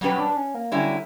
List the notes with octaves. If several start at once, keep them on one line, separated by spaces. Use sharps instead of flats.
B2 F#3 G3 C#4 G4 B4
D4
C#4
A#3
D3 F#3 G3 C#4 E4